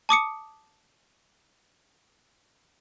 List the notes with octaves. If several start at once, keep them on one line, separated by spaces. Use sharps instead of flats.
A5 D6 D#6 C#7